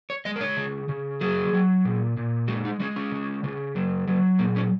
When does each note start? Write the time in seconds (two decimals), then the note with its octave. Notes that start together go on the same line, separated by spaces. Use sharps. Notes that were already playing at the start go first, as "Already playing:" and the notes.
0.10 C#5
0.25 G#3 D#5
0.36 A#4
0.41 C#5
0.57 C#3
0.89 C#3
1.21 F#3 G#4
1.53 F#3
1.85 A#2
2.17 A#2
2.48 G#3 F#4
2.65 D#4
2.80 G#3 C#4
2.96 C#4
3.12 C#3
3.44 C#3
3.75 F#3
4.07 F#3
4.39 A#2 A#3
4.56 C#4